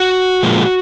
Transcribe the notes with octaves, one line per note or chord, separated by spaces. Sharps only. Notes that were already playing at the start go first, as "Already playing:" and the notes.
Already playing: F#4
A#2 F3 G#3